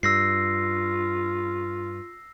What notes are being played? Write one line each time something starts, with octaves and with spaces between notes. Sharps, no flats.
G2 F4 E6 A#6 C7